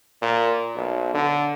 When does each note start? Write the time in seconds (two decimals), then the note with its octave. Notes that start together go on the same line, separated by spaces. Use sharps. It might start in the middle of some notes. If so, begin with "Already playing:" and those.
0.22 A#2
0.76 B1
1.14 D3